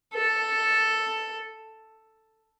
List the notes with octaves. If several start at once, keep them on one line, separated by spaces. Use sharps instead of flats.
A4